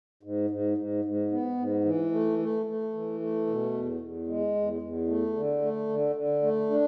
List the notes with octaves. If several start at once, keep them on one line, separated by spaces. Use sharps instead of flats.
G#2
G#2
G#2
G#2
B3
G#2
E3
A3
A3
A3
E3
A3
B2
E2
E2
G#3
E2
E2
A3
D3
A3
D3
D3
A3
D4